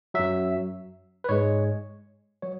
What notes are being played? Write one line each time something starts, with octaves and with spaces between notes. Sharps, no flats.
F#2 F#3 E5
B4
G#2 G#3 C#5
F#3 C#5